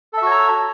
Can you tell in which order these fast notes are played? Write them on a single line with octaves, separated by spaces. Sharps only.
A4 E5 F#4 C#5 A#5